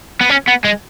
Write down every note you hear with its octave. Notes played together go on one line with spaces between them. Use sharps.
B3
C#4
B3
G#3